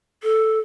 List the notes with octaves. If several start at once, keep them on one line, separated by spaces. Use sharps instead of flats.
A4